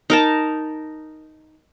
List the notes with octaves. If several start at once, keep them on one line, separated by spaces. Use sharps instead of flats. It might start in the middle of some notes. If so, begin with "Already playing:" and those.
D#4 A#4 A5